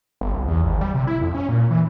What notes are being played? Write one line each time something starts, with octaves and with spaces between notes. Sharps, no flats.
G1
C2
E2
G#1
G3
C3
E4
F2
C#4
A#2
E3